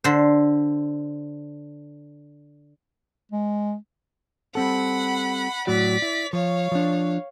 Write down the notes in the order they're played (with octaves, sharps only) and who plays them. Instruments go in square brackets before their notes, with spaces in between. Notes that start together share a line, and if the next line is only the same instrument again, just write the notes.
[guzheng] D3 C5
[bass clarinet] G#3
[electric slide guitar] G3 C4 A4 [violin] F#5 B5
[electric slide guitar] A2 F#3 F#4 [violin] D5 B6
[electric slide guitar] E4
[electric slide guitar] F3 [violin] C#5 F5
[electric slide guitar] F3 D4